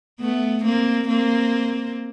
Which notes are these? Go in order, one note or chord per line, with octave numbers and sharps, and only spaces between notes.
A3 B3
A#3 C4
A#3 C4